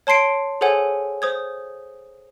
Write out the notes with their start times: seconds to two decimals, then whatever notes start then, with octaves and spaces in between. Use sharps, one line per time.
0.07 C#5 A5 C6 C7 D7
0.61 G#4 A4 C5 C#5 F#5 G#5
1.22 C5 D#6 G#6